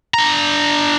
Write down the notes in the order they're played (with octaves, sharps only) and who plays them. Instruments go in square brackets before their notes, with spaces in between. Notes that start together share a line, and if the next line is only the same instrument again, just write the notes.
[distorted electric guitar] D4 A#5